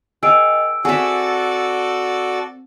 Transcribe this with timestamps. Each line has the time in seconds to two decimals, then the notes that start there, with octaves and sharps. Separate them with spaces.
0.23 G#4 A#4 D#5 G5 E6 D7
0.85 C4 F#4 G#4 A4 D5 E5